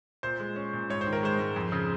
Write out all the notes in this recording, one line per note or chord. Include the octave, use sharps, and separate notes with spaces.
A#2 C5
G#3
C#4
A#2
G#2 C#5
C5
D#3
A#4
G#3 C5
G#2
F2
C#3